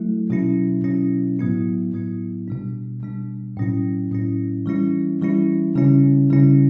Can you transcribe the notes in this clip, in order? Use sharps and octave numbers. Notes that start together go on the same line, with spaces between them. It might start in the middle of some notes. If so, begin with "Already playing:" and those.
Already playing: F#3 A3 E4
B2 F#3 C#4 E4
B2 F#3 C#4 E4
A2 F#3 B3 E4
A2 F#3 B3 E4
B2 G3 D4
B2 G3 D4
A2 F#3 C#4 E4
A2 F#3 C#4 E4
E3 G3 C#4 E4
E3 G3 C#4 E4
C#3 G3 C#4 E4
C#3 G3 C#4 E4